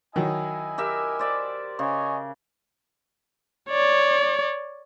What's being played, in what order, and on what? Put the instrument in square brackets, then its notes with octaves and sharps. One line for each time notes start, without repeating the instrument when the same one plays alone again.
[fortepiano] D#3 F#3 [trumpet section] E4 D#5 G#5
[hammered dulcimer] G4 A#4 E5
C5 D5 E5
[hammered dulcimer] C#3 [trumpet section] C#5 D#5 G#5
[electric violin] C#5 D5